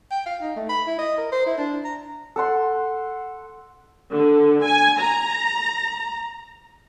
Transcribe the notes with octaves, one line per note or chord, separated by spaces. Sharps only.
G5
F5
D#4
A3
B5
E4
D#5
A#4
C5
E4
D4
A#5
A4 F#5 C6
D3
G#5
A#5